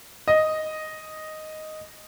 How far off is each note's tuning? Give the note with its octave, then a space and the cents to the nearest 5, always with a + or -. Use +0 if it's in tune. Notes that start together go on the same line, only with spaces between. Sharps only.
D#5 +0